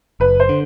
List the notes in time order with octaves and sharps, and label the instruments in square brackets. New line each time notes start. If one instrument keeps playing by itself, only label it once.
[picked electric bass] F#1 [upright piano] B4
[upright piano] C5
[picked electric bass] D3